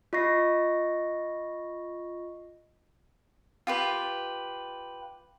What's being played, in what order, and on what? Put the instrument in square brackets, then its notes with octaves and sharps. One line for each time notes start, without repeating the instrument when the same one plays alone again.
[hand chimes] F4 D#5 C#6 A#6 C7
[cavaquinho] F4 G4 B4